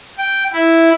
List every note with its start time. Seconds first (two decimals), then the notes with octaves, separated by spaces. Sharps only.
0.18 G5
0.52 E4